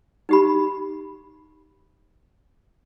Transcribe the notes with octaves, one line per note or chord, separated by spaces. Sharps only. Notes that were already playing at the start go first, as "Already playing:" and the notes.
D#4 G4 B5